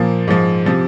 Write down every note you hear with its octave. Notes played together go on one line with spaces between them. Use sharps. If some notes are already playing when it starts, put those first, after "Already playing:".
Already playing: A#2 F3 A#3
G#2 F3
C3 F3